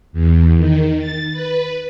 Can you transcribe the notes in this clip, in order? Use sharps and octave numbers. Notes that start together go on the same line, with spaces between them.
E2
D#3
A6
B4